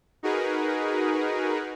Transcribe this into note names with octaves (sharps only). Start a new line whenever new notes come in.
D#4 F#4 G#4 A#4 B4